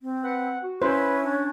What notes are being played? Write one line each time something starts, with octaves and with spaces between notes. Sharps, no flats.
C4
B4 F#5
F#4
C#4 E4 B4 C5
D4